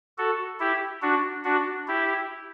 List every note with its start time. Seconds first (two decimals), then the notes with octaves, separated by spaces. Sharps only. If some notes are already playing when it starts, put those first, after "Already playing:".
0.18 F#4 A4
0.59 E4 G4
1.02 D4 F#4
1.44 D4 F#4
1.88 E4 G4